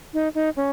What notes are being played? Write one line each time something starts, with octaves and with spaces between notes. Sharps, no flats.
D#4
D#4
C#4